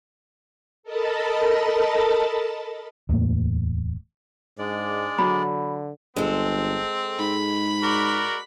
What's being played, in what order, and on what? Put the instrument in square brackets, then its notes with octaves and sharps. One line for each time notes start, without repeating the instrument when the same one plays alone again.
[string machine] A4 A#4 D#5 A5 B5 A6
[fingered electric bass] D1 E2 A2 A#3
[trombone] G#2 [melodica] G#3 D4 D5
[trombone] D3 [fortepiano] F#3 [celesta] B5
[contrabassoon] G1 [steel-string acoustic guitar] G#3 A4 [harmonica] C4
[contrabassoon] G#2 [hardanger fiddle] B5
[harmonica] F#4 A#4 D5